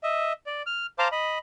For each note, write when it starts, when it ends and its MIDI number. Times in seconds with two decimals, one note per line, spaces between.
0.03 0.33 75
0.03 0.33 76
0.46 0.62 74
0.66 0.86 89
0.99 1.08 72
0.99 1.08 77
0.99 1.08 81
0.99 1.08 82
0.99 1.08 84
0.99 1.08 86
1.12 1.38 75
1.12 1.38 83